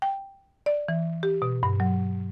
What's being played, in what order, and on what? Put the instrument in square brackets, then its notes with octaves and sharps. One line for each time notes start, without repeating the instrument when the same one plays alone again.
[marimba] G5
D5
E3
G4
B2
G2
F#3